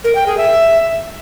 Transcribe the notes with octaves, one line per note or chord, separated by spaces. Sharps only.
A#4
G5
G#4
E5